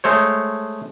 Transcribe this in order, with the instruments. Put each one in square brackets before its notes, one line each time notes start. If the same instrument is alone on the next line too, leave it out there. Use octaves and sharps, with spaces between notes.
[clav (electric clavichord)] G#3 A3 C5 C#5